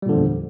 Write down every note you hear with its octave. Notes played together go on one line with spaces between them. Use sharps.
E2 A#2 D3 F3 G3